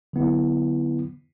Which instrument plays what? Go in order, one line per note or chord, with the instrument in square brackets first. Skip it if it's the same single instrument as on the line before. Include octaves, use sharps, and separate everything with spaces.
[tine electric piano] D3 F#3 B3 E4